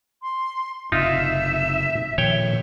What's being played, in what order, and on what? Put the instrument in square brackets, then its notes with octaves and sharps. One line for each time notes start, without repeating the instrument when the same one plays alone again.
[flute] C6
[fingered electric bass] F#1 C3 [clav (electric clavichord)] D#4 F4 [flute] E5
[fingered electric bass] A#2 D#3 F3 [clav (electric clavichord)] C#5 G5